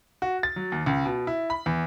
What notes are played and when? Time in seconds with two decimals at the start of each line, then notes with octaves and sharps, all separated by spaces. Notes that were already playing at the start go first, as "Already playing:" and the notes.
0.22 F#4
0.43 A6
0.56 F#3
0.72 D#2
0.86 C#2
1.06 B2
1.27 E4
1.50 B5
1.66 E2